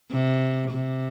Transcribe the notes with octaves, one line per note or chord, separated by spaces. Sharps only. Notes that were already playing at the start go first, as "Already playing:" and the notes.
C3
C3